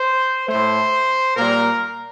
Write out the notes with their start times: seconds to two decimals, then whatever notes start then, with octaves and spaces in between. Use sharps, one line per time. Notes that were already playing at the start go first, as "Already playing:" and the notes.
Already playing: C5
0.49 A2 A3 C5
1.37 A#2 G3 A#3 A#4